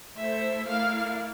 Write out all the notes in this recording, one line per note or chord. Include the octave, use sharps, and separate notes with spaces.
A3 E4 A4 C5 E5
A3 E4 A#4 D5 F5